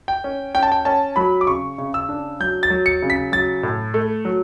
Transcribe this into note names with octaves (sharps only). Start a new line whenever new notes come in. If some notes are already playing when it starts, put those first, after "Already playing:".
G5
C#4
C#4 G5
A5
G5
C#4 A5
F#3 B5
D6
C#3 C#6
C#3
E6
D4
F#3 G6
A6
F#3
C#7
C#3
B6
F#3 A6
A2
A3
F#3